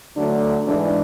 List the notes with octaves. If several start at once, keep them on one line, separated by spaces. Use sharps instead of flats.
D2 D3 F#3 A3 D4
G#2 E3 G#3 D4